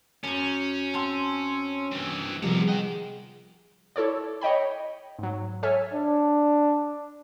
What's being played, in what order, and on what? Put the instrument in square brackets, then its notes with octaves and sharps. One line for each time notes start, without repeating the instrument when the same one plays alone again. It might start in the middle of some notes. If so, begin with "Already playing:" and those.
[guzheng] F#2 C5 [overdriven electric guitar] C#4
[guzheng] C4 F#5 [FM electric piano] A5 C6 E6
[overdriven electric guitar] G2 E3
[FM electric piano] C3 F3 G3 [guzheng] G#3 [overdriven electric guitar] B3 A#4
[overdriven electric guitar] A#4 D#5 [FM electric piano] F#5 G5
[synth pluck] E4 A4 C#5 D5
C#5 D#5 G5 B5
G#2 F#3
A4 C#5 E5 G#5 F6
[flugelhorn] D4